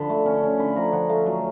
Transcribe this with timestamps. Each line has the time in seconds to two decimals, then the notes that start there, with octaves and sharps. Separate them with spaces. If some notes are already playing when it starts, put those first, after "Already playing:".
Already playing: D3 F3 A5 B5
0.09 A3
0.26 C#4
0.43 C#4
0.59 D3 B5
0.76 F3 A#5
0.92 F3 F#5
1.09 A3 F5
1.26 F#3